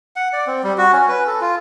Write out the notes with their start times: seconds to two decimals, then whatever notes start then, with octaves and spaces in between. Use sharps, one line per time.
0.16 F#5
0.33 D5
0.47 C4
0.64 G3
0.78 F#4
0.93 C#4
1.08 B4
1.27 A4
1.41 F4